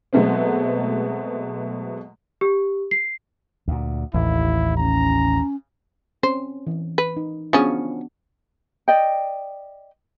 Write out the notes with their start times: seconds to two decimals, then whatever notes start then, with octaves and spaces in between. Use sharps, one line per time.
0.13 B2 F#3 G#3 A3 B3 C4
2.41 G4
2.91 C7
3.68 D2 A#2
4.14 A1 D#2 E4
4.77 C#4 A#5
6.23 C4 C#4 C5
6.67 E3
6.98 B4
7.17 D#4
7.53 C#3 F3 B3 C#4 D4 F#4
8.88 D5 D#5 G5